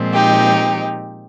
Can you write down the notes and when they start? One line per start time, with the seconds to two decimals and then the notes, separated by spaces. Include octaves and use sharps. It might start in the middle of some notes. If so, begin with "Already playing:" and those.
Already playing: A#2 F3 G#3 C4
0.13 D#4 G4